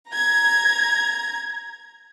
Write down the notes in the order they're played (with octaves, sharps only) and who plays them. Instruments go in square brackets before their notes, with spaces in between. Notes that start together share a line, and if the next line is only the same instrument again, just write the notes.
[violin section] A#5 G#6